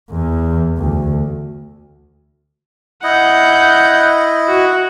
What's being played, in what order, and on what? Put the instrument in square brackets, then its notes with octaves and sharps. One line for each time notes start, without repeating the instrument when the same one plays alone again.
[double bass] E2
D2
[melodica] E4 D#5 [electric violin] F#5 G6
[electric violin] F#4